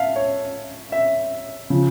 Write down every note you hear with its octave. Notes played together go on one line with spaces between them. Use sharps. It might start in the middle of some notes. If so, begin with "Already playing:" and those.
Already playing: E5 F5 A5
C#5
E5
C#3 F3